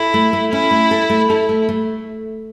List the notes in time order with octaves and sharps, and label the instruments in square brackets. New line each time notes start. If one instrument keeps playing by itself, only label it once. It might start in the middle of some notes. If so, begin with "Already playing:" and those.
Already playing: [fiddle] E4 [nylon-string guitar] A4
[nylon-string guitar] A3
A3
[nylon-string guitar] C#4 [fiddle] E4
[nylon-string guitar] A3
A4
A3
[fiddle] E4 [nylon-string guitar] A4
[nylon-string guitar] A3
A3